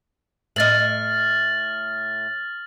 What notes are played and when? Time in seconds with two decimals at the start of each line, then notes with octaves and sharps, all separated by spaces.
0.56 A2 D#5 F6 A6 F#7